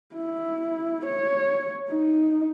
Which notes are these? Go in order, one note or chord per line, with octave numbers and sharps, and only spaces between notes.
E4
C#5
D#4